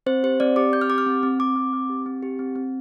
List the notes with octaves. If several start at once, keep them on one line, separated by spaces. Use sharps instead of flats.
C4 C5
G4 C5
C4 D5
G4 D6
C4 G6
F6
G4 D6
F6
C4
C4
C4 D6
C4
C4
G4
C4
G4
C4
C4